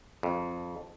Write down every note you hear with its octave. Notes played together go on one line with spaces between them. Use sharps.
F2